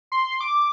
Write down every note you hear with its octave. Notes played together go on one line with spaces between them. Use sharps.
C6
D6